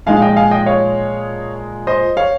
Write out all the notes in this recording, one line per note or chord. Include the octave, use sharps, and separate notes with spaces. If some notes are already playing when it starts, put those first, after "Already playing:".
A#2 F3 G#3 D#4 F5 G#5
F5
D#5 G5
F5 G#5
D#5 G5
C#5 F5
C5 D#5
C#5 F5